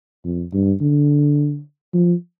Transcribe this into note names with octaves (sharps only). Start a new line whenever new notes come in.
F2
G2
D3
F3